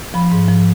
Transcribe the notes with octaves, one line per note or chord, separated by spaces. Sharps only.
F3 B5
G#2
F3